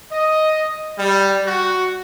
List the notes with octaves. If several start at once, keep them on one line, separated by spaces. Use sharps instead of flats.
D#5
G3
F#4